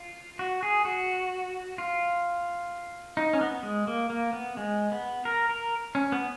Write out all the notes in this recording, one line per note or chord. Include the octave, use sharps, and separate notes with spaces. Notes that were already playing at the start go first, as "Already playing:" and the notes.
Already playing: F4
F#4
G#4
F#4
F4
D#4
C#4
B3
G#3
A#3
A#3
B3
G#3
B3
A#4
A#4
C#4
B3